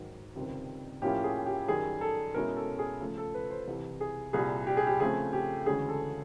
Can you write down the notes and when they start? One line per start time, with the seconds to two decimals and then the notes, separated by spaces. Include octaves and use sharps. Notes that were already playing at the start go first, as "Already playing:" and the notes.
Already playing: G#2 D#3 F#3
0.36 C#2 C3 D#3 G3 C4
1.02 A2 F3 A#3 C#4 E4 G4
1.24 G#4
1.46 G4
1.68 F#2 D#3 G3 G#4
2.01 A4
2.34 B2 G#3 C#4 E4 A#4
2.57 A4
2.79 G#4
3.01 C#3 F3 A3 A4
3.18 A4
3.34 B4
3.51 C5
3.67 C2 C3 E3
4.01 G#4
4.33 C2 A#2 G3 G#4
4.67 G4
4.77 G#4
4.87 G4
5.00 C#3 F3 A3 C4 G#4
5.33 G4
5.66 D2 C#3 E3 G#3 C#4 G#4
5.89 A4